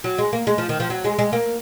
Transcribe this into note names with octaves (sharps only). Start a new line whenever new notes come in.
F#3
G#3
A#3
G#3
F3
D#3
F3
F#3
G#3
G#3
A#3